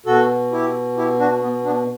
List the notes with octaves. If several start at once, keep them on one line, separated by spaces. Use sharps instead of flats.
B2 F#4 A4
E4 G4
E4 G4
D4 F#4
B3
B3 D4